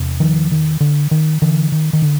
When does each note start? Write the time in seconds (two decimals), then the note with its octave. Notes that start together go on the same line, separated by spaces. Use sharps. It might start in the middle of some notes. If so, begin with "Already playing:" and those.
Already playing: E2 C3
0.20 D#3 F3
0.51 D#3
0.80 D3
1.11 D#3
1.42 D3 E3
1.72 D#3
1.93 D#3
2.02 D3